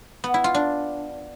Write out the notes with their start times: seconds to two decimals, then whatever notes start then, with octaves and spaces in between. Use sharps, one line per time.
0.24 B3
0.34 E4
0.44 F4
0.54 D4